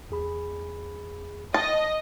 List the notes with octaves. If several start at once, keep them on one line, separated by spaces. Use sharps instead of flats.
E2 G#4 B5
D#5 A5